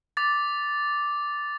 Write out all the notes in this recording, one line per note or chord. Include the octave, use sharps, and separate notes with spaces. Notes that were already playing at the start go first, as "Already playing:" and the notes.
D6 A6